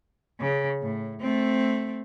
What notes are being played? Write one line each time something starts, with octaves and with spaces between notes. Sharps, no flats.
C#3
A2
A3 C4